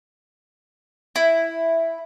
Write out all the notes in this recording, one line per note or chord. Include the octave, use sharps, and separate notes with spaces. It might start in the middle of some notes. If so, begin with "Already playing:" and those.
E4